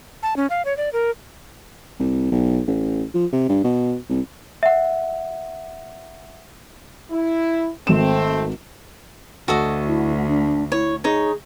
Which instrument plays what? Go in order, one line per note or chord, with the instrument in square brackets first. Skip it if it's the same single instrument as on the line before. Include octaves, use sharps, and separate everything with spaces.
[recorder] A5
C#4
F5
C#5
D5
A#4
[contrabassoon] C2
B1
A1
F3
C3
G2
B2
C2
[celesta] E5 F#5
[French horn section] E4
[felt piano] G#1 E7 [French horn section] A3 C4
[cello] D2 [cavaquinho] F#4 A4 D#5
[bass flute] E4
D4
[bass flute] E4 [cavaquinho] C#5
[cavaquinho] D#4 C#5 [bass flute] G#4